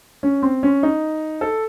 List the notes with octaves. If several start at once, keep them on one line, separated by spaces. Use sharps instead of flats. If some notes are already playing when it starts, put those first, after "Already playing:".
C#4
C4
C#4
D#4
A4